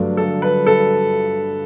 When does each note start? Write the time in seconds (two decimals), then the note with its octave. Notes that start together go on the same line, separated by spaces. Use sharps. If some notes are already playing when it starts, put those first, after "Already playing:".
Already playing: G2 D3 F#3 A3 D4
0.17 A4
0.42 B4
0.66 A4